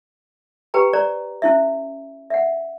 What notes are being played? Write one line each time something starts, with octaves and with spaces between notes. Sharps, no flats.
G4 B4 G5 A#5
C5 D5 A#5
C#4 E4 E5
E5 F#5